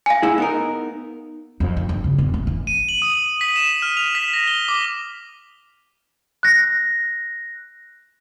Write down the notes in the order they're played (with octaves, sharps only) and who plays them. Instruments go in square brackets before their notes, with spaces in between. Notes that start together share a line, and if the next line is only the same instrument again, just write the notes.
[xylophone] F5 G#5
[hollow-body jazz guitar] A2 E4 G#4
B3 D#4 A#4
[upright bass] F2
D#3
G2
C#3
E1
A3
E3
[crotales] D#7
F#7
D#6
B6
E7
F6
F7
B6
A#6
G7
D6
[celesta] F#6 A#6